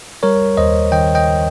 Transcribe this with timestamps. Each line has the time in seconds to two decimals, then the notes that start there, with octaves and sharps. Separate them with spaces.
0.23 G3 A#4 C#5
0.57 D#2 C5 D#5
0.92 D#3 D#5 G5
1.15 D#5 G5